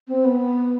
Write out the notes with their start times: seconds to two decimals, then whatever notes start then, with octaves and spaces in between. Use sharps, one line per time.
0.08 C4
0.25 B3